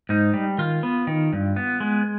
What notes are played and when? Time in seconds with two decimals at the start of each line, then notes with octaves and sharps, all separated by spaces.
0.09 G#2 D#4
0.34 G3
0.58 D#3 F4
0.83 B3
1.07 D#3
1.33 G2
1.56 B3
1.80 G#3